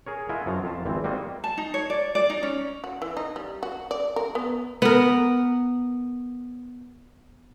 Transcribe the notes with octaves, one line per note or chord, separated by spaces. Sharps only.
G#4 A#4 C#5
E4 F4 A#4 D#5 F#5 G#5
F#2 F3 F#3 A#5
F2 F4 A5
G#1 E3 C4
G3 A#3 C4 F#4 D#5
A5
D#4
C#5
D5
D5
D#4
C#4
F#4
E3
D#4
G3
F#4
D5
A#4
B3
B3 A#4